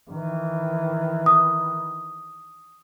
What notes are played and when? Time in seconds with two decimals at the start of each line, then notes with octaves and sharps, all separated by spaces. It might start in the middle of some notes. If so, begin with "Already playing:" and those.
0.10 D#3 E3
1.26 D#6